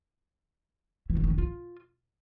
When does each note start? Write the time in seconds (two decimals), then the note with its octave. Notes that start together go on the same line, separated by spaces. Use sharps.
1.10 E3
1.17 C#3
1.24 D#3
1.31 C#4
1.38 F4